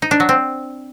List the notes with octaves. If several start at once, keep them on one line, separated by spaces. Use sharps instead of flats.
D#4
D4
F#3
C4